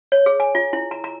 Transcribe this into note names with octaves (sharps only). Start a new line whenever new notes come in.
C#5
G#4
G#5
F4
E4
A#5
A#5